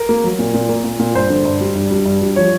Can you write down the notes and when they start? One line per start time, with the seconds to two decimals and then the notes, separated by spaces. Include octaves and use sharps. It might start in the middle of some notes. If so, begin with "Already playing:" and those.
Already playing: A#4
0.09 A#3
0.24 F#3
0.39 A#2
0.54 A#2
0.69 A#3
0.84 A#2
0.99 A#2
1.15 G2 C5
1.30 D3
1.45 G2
1.61 G3
1.75 G2
1.91 G3
2.06 G2
2.21 G3
2.36 F3 C#5